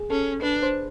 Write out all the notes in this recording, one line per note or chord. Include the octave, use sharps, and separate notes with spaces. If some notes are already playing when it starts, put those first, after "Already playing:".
Already playing: G#4
C#4 A4
D4 B4
C5